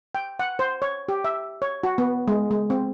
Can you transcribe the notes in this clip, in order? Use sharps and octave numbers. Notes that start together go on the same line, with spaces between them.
G5
F#5
C5
C#5
G4
E5
C#5
F#4
B3
G#3
G#3
C4